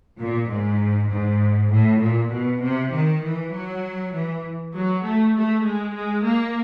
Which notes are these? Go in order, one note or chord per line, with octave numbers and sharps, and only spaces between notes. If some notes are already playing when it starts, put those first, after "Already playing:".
A#2
G#2
G#2
A2
A#2
B2
C3
D#3
E3
F#3
E3
F#3
A3
A3
G#3
G#3
A#3